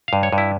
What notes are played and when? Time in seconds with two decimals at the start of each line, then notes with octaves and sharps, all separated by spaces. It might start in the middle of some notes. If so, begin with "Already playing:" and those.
0.08 G2 F5
0.23 C#5
0.33 G2
0.38 E4